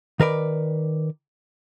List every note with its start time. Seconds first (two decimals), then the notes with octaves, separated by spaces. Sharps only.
0.20 D#3 A#4 B4 D5